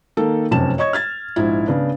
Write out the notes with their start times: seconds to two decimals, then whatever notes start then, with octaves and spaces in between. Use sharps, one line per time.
0.17 D#3 A#3 A4
0.51 F1 F#2 C3 C#4 A5 E7
0.78 C#5 D#5 C#6 G#6
0.93 F6 G#6 A6
1.36 A#1 G#2 E4
1.67 C#3 B3 D4